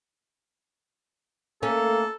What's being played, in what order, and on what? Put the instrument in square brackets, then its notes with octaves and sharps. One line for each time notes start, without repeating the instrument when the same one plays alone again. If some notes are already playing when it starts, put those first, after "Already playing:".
[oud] A3 C#4 [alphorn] A#3 [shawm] A4